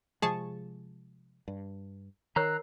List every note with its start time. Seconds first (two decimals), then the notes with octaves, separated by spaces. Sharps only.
0.22 C3 F3 G#3 G#4 A5 C#6
1.48 G2
2.36 D#3 A#4 C#5 A#5 E6 F#6 C7